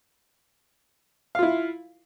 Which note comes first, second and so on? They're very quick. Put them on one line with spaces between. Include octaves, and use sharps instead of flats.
F5 F4 E4